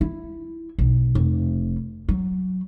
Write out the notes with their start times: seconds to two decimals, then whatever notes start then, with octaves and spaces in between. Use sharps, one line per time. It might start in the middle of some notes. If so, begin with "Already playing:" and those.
0.01 E4
0.78 B1
1.15 F1
2.09 F#3